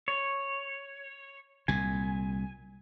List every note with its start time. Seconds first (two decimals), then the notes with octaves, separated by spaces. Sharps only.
0.08 C#5
1.68 C2 A#2 G#5